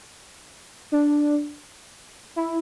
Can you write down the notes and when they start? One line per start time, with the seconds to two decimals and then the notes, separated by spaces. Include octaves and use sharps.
0.92 D4
2.36 E4